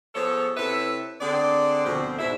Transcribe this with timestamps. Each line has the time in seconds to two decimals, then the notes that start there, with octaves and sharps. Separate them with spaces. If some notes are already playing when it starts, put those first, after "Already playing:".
0.15 F3 B3 G#4 A4 C#5
0.57 C3 E4 A4 B4 C#5 E5
1.21 D3 C4 G#4 D5
1.86 D2 B2 D3 F3 C4 F#4
2.19 G#2 B2 D4 E4 E5